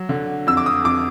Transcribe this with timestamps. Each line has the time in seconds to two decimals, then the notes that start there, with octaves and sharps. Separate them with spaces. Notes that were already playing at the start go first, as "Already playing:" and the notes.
Already playing: F#3
0.09 D3
0.47 F2 E6
0.57 D6
0.66 D#6
0.85 F2 D6